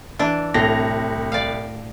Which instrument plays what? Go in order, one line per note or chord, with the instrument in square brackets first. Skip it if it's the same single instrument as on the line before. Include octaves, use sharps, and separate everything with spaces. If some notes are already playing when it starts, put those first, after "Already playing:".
[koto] E3 D4
[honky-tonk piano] C2 A#6 F7 [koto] A2
[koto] D5 F5